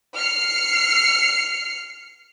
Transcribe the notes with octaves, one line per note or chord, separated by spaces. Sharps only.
F6 C7 C#7